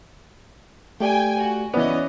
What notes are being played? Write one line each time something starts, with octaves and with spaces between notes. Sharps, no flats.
A3 G4 D5 G5 G#5
F#4
E3 B3 C#4 D5 D#5